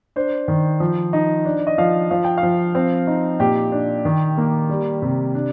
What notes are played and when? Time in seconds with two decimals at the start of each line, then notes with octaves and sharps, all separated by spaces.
0.16 D4 C5
0.48 D#3
0.80 F3
1.13 D#4
1.45 D4
1.67 D#5
1.78 F3 F5
2.11 F3 F5
2.24 G5
2.38 F5
2.43 F3
2.75 C4
3.07 D#4
3.39 A#2 G4
3.72 D4
4.05 D#3
4.38 A#3
4.69 G3
5.02 C3
5.35 D4